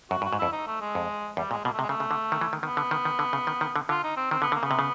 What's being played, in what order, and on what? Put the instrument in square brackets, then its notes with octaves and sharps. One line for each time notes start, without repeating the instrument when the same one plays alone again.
[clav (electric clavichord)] F#2 [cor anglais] F#4
[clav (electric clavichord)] G2
[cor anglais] F#4
[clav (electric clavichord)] G#2
[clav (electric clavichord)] F2 [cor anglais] E4
[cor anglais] D#4
A3
G#3
[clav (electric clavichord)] F2
[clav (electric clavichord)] E2 [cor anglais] G3
[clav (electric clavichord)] A#2 [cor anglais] G#3
[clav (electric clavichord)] B2 [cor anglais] A#3
[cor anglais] A3
[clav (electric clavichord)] C3
[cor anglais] G#3
[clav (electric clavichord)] C#3 [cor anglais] A3
[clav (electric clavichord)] C#3
D3
D#3
E3
D#3
[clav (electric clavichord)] D#3 [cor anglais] B3
[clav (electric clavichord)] D3
D#3
D#3
D3
C#3
D#3
D#3
D3
[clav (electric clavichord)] D3 [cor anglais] F4
[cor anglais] D#4
C4
[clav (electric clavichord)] D#3 [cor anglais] C4
[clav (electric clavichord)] D3 [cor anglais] B3
[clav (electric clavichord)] D3
[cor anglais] A#3
[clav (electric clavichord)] C#3 [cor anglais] B3
[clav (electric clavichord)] C3
C#3